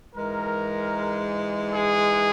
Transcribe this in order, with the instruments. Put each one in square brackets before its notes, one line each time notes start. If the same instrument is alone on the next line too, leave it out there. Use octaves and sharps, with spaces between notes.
[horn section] G#2 E3 G#3 A#4
G#4